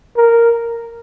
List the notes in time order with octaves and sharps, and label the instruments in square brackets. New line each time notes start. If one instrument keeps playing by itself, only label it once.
[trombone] A#4